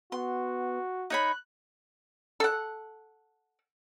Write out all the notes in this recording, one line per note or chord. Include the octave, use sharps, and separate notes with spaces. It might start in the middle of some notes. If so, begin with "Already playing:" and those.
B3 F#4 C6
D#4 C#5 B5 F#6
A4 F#5